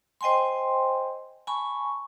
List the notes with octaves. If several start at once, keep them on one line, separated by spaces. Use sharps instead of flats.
C5 D#5 G5 G#5 C6
G#5 A5 B5 C#6